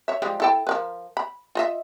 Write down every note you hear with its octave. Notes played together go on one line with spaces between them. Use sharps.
C#5 E5
F3 G3 G#3
E4 A4 G5
F3 A#4 B4
B5
F4 D#5 E5